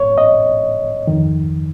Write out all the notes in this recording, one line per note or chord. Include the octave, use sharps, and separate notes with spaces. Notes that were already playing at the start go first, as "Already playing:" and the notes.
Already playing: A2 C#5
D#5
F2 D#3